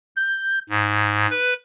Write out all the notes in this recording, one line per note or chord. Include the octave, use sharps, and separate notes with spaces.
G6
G#2
B4